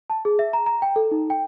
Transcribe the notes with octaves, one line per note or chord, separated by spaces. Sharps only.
A5
G#4
E5
A#5
A#5
G5
A4
D#4
G5